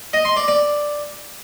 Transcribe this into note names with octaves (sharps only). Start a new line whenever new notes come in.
D#5
C6
D5
D5